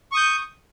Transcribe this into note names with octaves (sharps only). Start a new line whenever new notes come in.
C#6 D#6 G6